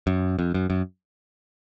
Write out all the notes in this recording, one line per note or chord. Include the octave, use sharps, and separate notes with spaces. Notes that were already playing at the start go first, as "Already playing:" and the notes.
F#2
F2
F#2
F#2